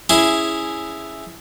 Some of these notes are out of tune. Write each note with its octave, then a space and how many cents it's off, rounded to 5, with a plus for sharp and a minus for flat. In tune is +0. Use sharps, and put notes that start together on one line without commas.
C#4 +0 E4 +0 G#4 +0